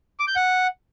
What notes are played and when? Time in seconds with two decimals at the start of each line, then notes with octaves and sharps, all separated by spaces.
0.19 D6
0.28 G6
0.36 F#5